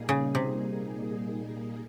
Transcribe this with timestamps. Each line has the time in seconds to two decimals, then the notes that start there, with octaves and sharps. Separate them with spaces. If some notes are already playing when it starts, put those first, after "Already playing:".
Already playing: A#2 G3 A#3 D#4 G#4
0.09 C#3
0.35 C3